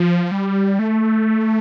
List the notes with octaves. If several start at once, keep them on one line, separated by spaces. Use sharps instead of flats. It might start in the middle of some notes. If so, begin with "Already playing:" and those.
Already playing: F3
G3
A3